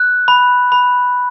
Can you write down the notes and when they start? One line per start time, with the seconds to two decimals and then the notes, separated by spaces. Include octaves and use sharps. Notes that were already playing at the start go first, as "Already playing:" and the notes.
Already playing: F#6
0.28 B5
0.72 B5